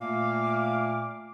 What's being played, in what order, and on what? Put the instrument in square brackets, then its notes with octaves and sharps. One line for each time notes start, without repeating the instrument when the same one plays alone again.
[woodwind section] A#2 A3 A#3 F5 D6 F6